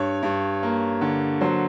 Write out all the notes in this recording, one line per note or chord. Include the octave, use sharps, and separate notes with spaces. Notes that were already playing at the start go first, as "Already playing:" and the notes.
Already playing: G2 C#5
G2
A#3
D3
F#3 C5